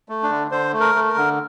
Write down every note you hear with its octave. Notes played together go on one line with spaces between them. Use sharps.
A3
D4
D3
D3 C5
A3
A#4
A3
A#4
D3